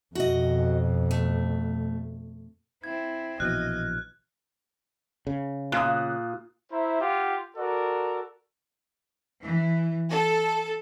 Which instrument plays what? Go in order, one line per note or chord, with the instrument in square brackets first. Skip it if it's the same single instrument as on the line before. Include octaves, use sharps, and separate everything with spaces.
[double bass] F2 B2 [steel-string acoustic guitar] F#4 D#5
[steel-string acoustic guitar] A3
[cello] C4 E4 [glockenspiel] G#6
[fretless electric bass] A#1 B2 E3 [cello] D#5 [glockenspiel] F6 [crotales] F#6
[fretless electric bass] C#3
[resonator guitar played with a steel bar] A#2 [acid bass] F4 [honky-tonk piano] D#6 F#6
[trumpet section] E4 C5 E5 A#5
F4 G4 F5 F#5
F#4 A4 A#4 D5
[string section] E3
A4